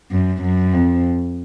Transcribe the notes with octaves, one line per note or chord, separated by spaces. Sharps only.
F#2
F#2
F2